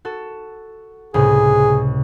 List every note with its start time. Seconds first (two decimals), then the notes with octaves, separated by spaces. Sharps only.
0.05 F#4 A4
1.14 C#2 A2 C3 G#4